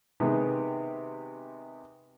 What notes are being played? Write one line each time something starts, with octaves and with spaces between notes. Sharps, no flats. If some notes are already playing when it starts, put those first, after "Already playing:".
C3 D#3 G#3 B3 G4